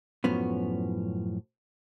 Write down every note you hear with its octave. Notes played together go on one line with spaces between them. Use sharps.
F#2 A2 F3 B3 C#4